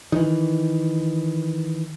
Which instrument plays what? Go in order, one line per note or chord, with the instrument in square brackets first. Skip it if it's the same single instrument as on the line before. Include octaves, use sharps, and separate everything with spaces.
[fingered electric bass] D#3 E3